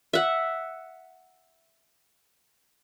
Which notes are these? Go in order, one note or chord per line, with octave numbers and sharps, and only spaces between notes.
E5 F#5